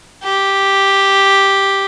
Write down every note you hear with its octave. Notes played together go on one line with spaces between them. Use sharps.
G4